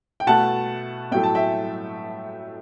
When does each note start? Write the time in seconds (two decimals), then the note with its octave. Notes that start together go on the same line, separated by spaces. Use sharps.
0.20 G5
0.27 B2 A3 F#5 A5
1.12 A2 F#3 A3 G5
1.23 A5
1.35 E5 G5